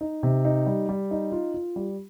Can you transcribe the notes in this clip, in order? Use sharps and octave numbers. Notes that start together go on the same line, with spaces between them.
D#4
C3
D#4
G3
G3
D#4
F4
F4
G3